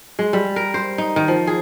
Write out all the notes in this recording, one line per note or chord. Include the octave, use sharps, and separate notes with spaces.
G#3
G3
A#4
C5
D#4
D#3
F3
G#4